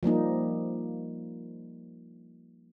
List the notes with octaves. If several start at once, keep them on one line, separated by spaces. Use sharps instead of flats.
F3 G3 A#3 D#4